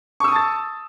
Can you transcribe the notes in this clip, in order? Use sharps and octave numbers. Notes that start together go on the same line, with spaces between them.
A5 C#6 D#6 E6 A6